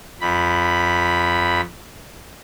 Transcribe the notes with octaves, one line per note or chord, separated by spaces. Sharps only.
F2 B5